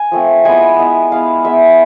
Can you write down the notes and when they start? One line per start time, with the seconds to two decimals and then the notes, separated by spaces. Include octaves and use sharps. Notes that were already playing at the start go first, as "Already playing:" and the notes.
Already playing: G#5
0.12 F3 A3 C4
0.45 G#3 B3 E4 G#5
0.79 G#3 B3 E4
1.12 G#3 B3 E4 F5
1.45 G#3 B3 E4 E5